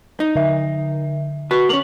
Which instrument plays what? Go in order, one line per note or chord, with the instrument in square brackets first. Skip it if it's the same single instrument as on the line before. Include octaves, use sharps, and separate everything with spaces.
[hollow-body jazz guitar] D#4
[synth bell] D3 E5
[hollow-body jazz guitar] F#4 B4
[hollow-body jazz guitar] A#3 C#4 [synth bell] F7 F#7